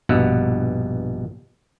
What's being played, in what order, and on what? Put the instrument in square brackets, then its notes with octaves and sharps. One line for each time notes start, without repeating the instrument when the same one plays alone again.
[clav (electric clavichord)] A#1 G2 B2 B3 E5 F#5